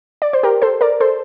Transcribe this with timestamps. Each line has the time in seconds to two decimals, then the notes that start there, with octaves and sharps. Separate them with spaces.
0.22 D5
0.33 C5
0.43 G4 A#4
0.62 A4 C5
0.81 A#4 D5
1.00 A4 C5